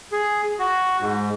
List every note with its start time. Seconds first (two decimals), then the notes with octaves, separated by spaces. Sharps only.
0.12 G#4
0.59 F#4
1.00 G#2